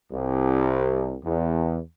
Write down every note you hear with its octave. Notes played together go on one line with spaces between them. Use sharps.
C2
E2